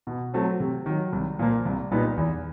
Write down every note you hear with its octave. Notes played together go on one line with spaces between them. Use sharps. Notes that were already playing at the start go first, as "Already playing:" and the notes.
B2
F#3 A3 C4
C3
D#3 F#3
C2
A#2 F3 A#3
C2
A#2 G3 B3 D#4
E2